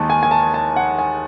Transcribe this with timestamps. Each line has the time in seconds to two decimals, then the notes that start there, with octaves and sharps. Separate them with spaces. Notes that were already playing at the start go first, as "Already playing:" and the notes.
Already playing: D#2 D#3 G#3 A5
0.10 G#5
0.23 G#5
0.31 A5
0.54 A5
0.76 F#5
0.99 G#5